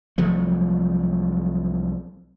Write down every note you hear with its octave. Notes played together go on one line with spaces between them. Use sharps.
C2 F3 F#3 A3